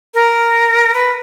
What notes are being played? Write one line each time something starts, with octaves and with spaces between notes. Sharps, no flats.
A#4
B4